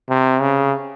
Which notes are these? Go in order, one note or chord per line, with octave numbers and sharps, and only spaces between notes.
C3
C#3